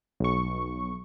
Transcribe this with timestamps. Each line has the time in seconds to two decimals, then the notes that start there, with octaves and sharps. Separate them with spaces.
0.20 B1 C#6